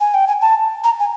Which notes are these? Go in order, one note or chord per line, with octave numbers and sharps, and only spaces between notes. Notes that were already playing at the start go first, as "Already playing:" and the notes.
G#5
G5
G#5
A5
A#5
G#5